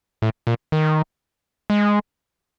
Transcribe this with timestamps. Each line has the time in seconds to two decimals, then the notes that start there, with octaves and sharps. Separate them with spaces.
0.22 A2
0.47 A#2
0.72 D#3
1.70 G#3